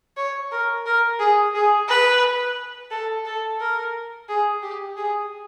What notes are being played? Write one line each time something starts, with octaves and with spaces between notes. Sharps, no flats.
C#5
A#4
A#4
G#4
G#4
B4
A4
A4
A#4
G#4
G4
G#4